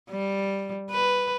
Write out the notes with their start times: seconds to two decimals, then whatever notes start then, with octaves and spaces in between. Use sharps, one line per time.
0.10 G3
0.90 B4